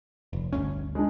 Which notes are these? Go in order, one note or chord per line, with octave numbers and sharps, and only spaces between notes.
F1
G1 D2 C#4
G#3 D4